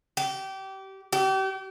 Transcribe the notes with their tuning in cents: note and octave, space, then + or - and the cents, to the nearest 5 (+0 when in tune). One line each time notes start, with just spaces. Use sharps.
G4 -25
G4 -35